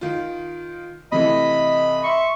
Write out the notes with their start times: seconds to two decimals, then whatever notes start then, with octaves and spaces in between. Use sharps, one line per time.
0.01 D#3 F4
1.12 C3 E3 A3 D#5 B5
2.03 E5 C6 C#6